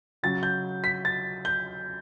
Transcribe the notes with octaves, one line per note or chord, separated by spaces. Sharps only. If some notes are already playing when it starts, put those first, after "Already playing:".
C#3 F#3 A6
G6
B6
A6
G6